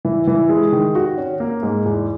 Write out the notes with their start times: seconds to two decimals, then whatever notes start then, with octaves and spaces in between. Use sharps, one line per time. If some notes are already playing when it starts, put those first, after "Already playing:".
0.05 E3
0.27 E3
0.49 G#3
0.73 D#3
0.95 F#4
1.17 C#4
1.40 A#3
1.63 G#2
1.86 E2